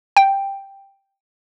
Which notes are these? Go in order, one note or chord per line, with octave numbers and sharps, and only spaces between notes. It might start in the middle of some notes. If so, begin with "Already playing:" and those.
G5